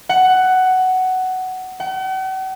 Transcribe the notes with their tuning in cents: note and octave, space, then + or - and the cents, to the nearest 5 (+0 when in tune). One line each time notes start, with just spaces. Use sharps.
F#5 +10
F#5 +45